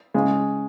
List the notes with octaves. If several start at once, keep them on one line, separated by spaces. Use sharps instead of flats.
C#3 G#3